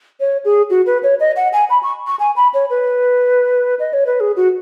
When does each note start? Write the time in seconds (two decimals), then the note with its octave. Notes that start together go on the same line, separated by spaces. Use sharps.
0.20 C#5
0.45 G#4
0.70 F#4
0.86 B4
1.03 C#5
1.20 D#5
1.36 F#5
1.53 G#5
1.70 B5
1.83 C#6
2.07 C#6
2.19 G#5
2.36 B5
2.54 C#5
2.70 B4
3.79 D#5
3.93 C#5
4.07 B4
4.20 G#4
4.36 F#4